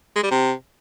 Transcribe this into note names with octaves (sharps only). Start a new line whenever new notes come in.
G#3
G3
C3